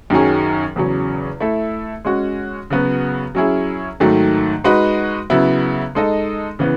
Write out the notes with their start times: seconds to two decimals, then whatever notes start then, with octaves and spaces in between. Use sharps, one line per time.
0.10 F#2 D#3 F#3 C#4 G#4
0.76 E2 C#3 F#3 C#4
1.40 A3 E4 A4 E5
2.05 G#3 C#4 F#4
2.70 C#3 F#3 B3 F#4
3.35 F#3 C#4 E4 G#4
4.00 G#2 D#3 F#3 A3
4.64 G#3 D#4 F#4 B4
5.30 C#3 F#3 B3 E4
5.95 G#3 D#4 A4 D#5
6.59 C#3 E3 B3